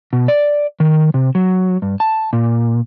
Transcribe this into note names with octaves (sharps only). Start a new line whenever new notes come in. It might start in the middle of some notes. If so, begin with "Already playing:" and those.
B2
D5
D#3
C3
F#3
G2
A5
A#2